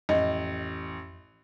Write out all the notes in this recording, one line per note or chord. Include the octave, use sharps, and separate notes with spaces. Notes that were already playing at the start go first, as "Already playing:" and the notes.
A1 F2 D#5